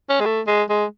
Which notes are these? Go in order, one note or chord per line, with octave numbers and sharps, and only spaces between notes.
C#4
G#3
A3
G#3
G#3